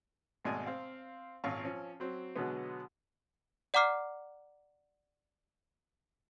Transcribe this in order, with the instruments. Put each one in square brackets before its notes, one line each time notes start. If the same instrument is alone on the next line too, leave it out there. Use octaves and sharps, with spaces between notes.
[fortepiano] G#1 B2 G#3 A3 D5 G#5
C4 F5
G#1 A#2 C#4 F4 F5 C#6
F3 C#4
F#3 C4
B2 D3 F#3 G#3 B3
[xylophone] D5 F#5 A#5 D6 F6 C7